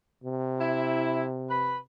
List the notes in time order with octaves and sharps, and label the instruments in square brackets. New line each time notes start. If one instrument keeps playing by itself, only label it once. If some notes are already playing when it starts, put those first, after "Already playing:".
[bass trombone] C3
[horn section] E4
B4 B5